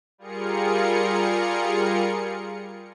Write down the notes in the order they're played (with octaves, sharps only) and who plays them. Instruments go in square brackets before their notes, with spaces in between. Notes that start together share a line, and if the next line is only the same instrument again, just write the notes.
[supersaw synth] G3 F4 G#4 A#4 C#7